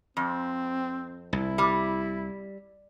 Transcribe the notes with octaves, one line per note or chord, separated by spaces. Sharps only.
F2 C4
C2 E4
G3